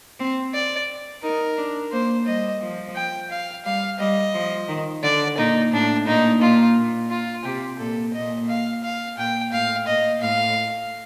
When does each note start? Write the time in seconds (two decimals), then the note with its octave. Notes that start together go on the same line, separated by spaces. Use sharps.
0.20 C4
0.54 D5
1.23 D#4 A#4
1.58 D4
1.92 A#3 C5
2.27 G3 D#5
2.61 F3
2.96 G5
3.31 F5
3.65 G3 F5
3.99 G3 D#5
4.34 F3
4.68 D#3
5.03 D3 D5
5.38 A#2 D#4
5.73 A2 D4
6.07 A#2 D#4
6.41 A#2 F4
6.76 A#2
7.11 F4
7.45 C3 G4
7.79 A#2 A4
8.14 A#2 D#5
8.49 F5
8.84 F5
9.18 A#2 G5
9.52 A2 F5
9.87 A#2 D#5
10.22 A2 F5